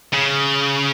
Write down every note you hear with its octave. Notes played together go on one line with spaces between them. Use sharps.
C#3